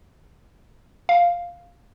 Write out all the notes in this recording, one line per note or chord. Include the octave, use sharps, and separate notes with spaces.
F5